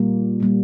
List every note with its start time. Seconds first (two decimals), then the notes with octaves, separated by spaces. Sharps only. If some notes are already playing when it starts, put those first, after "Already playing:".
Already playing: A#2 G3 A#3
0.40 A#2 G3 A#3